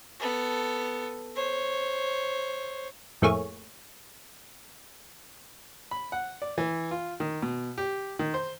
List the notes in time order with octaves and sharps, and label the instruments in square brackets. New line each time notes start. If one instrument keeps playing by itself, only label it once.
[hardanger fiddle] B3 A4
C5 C#5
[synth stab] F2 A2 A3 A#3 G#4 C#5
[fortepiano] B5
F#5
D5
E3
F4
D#3
B2
G4
D#3
C5